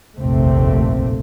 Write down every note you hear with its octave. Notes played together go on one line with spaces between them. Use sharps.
F1 A#1 D#2 C3 A3 C4